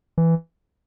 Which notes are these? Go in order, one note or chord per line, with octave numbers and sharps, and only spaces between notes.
E3